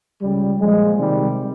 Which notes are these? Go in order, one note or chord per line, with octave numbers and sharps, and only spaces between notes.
C#2 C#3 G3
A#2 F3 G#3
C3 D#3 G3